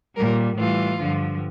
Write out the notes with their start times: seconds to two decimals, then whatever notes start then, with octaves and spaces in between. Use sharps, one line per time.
0.16 A#2 G3 A#4
0.57 A2 E3 G3 F4
0.98 G2 D3 F3